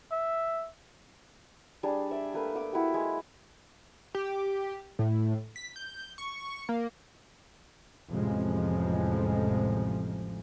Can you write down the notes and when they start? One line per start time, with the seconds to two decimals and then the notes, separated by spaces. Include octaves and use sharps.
0.12 E5
1.83 G3 D4 G#4
2.11 D5 E5
2.34 A3 A#3 B4
2.55 D6 D#6
2.73 E4 F#4 G4
2.94 G#3
4.15 G4
4.99 A2
5.56 B6
5.76 G6
6.18 C#6
6.69 A#3
8.11 A1 F2 C3 F3 G#3